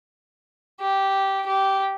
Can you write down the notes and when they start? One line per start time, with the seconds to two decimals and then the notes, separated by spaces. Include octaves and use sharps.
0.81 G4
1.47 G4